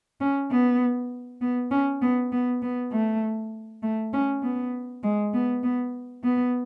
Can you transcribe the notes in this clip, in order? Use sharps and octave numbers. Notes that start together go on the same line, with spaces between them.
C#4
B3
B3
C#4
B3
B3
B3
A3
A3
C#4
B3
G#3
B3
B3
B3